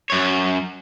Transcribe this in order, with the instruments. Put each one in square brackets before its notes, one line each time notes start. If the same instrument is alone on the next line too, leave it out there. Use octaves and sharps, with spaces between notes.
[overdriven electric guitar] F#2 C#5